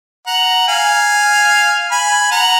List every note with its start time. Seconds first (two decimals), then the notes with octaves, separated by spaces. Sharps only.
0.27 F#5 A#5
0.68 F5 G#5
1.91 G#5 B5
2.31 F#5 A#5